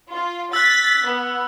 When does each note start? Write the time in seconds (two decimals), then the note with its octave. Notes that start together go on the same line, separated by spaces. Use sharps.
0.12 F4
0.53 E6 F#6 A6 B6
1.05 B3